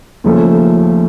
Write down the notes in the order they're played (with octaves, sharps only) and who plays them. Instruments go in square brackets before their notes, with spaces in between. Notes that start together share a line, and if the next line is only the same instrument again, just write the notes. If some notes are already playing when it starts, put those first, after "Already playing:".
[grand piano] D#2 C#3 F3 A3 C#4